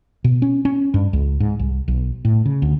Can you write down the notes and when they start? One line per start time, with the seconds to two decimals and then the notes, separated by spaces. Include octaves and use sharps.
0.24 B2
0.42 C#4
0.65 C#4
0.94 G2
1.13 C#2
1.40 G#2
1.59 C2
1.88 B1
2.25 A2
2.46 C#3
2.62 D2